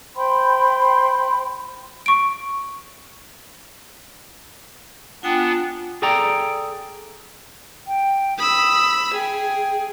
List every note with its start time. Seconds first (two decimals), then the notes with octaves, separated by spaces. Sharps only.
0.16 C5 G5 B5 C6
2.06 C#6 D7
5.23 B3 D4 F4 G5 G#5
6.02 G#4 A4 D5 G5 A#5
7.87 G5
8.38 B5 D#6 E6
9.14 G#4 G5